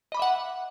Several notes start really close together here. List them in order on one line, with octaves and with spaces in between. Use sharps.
D#5 B5 D6 E5 F#5